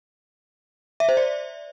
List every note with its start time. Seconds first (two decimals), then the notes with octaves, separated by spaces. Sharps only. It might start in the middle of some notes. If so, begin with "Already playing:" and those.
1.00 E5
1.09 C5
1.17 D5